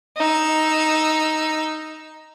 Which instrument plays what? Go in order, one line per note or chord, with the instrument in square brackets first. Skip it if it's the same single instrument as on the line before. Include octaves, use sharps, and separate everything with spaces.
[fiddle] D#4 E6